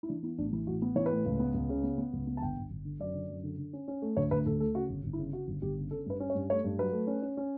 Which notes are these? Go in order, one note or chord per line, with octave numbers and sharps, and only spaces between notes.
E4
E3 D4
B3 E4
A1 D4
E3 E4
A1 F#4
B3
E3 C#5
A2 B4
C#2
B3
C#2
C#3
B3
B3
C#2
B3
A5
G1 G5
G1
G1
D3
F#2 D5
D3
F#2
D3
D3
C#4
C#4
A3
D2 C#5
D2 B4
D2 A4
A3 A4
C#3 F#4
G1
G1
E4
C#3
C#3 F#4
G1
G1 G4
C#3
C#4 A4
G2 B4
C#4
C#5
G2
A3 C#5
G2
F#3 B4
A3
C#4
C#4
C#4